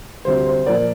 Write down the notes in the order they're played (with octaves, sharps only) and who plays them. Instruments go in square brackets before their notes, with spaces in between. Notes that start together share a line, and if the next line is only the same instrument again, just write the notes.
[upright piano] D2 C3 G3 C5
C5
A#2 F3 A#3 A#4 D5